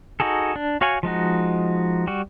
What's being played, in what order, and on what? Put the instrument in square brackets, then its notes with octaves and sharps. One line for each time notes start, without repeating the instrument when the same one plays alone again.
[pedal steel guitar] D#4 F#4 G#4 A4
D4
F#4 C#5 F5 F#5 G#5
F3 G#3 D#4 F#4
G3 F#4